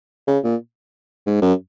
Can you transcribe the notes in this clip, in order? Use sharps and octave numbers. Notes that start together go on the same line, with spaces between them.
C#3
A#2
G#2
F#2